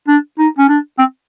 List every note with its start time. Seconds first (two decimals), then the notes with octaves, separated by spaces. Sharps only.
0.08 D4
0.39 D#4
0.59 C#4
0.69 D4
0.99 C4